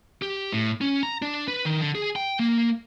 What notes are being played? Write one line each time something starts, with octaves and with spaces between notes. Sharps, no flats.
G4
A2
C#4
A#5
D4
B4
D#3
D3
G#4
G5
A#3